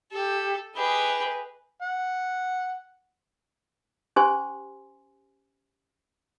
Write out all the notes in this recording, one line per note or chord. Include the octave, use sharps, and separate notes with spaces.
G4 A4
G4 G#4 B4 D#5 B5
F#5
C#4 G4 C5 G#5 C6